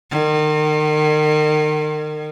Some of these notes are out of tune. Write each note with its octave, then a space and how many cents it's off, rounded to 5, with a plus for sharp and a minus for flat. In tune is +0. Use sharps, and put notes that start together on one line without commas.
D#3 -35